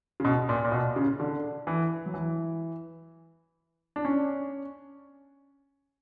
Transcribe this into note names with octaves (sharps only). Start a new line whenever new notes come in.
C#3
B2
A#2
A#2
B2
C#3
D3
E3
F#3
E3
D4
C#4